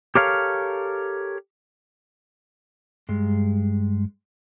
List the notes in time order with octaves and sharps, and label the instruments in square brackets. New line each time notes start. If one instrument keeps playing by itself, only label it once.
[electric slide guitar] G4 A4 A#4 C#5 F5
G2 G#3